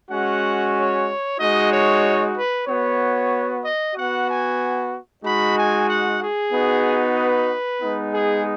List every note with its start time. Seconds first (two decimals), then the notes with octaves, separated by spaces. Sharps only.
0.10 G#3 C#4 F#4 F#5
0.75 C#5
1.38 G#3 D#4 F#4 D#5
1.70 C#5
2.35 B4
2.67 B3 F#4 C#5
3.64 D#5
3.95 B3 F#4 F#5
4.28 G#5
5.24 G#3 D#4 F#4 B5
5.57 G#5
5.89 F#5
6.21 G#4
6.53 B3 D#4 F#4
7.18 B4
7.82 G#3 B3 D#4
8.14 G#4